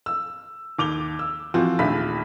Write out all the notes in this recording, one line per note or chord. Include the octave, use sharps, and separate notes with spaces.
E6
D#2 D6 F7 G7
E6
E3 F3 C4 F4 F#4
A#1 D#2 A3 B5 B6